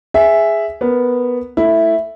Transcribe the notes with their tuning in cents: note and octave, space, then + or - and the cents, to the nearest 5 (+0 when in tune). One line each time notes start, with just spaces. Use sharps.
G#4 +0 E5 +0
B3 +0 A#4 +10
A3 +0 E4 +0